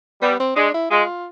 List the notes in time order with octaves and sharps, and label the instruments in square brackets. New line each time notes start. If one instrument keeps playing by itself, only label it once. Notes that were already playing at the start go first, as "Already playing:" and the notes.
[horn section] G3 [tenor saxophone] B3
[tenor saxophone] C4
[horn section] G#3 [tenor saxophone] D4
[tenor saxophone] E4
[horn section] G#3 [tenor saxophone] F4